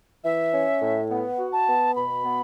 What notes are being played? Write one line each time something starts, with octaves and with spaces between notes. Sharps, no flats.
E3 E5
C#4
A2
B3
F#4
A5
B3
B2 B5
B3